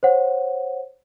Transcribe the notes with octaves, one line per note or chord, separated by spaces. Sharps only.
C5 C#5 F#5